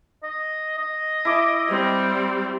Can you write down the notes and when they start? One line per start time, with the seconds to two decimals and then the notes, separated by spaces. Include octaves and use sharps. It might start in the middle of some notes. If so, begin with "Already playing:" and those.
0.23 D#5
0.78 D#5
1.25 E4 D6
1.69 G3 C4